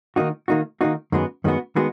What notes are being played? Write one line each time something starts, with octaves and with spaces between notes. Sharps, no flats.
D#3 A#3 D#4 F#4
D#3 A#3 D#4 F#4
D#3 A#3 D#4 F#4
F#2 D#3 G#3 B3 F#4
F#2 D#3 G#3 B3 F#4
D#3 G#3 B3 F#4